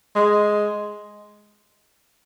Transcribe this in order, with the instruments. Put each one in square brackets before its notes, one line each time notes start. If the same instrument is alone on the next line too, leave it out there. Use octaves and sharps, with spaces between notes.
[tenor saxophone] G#3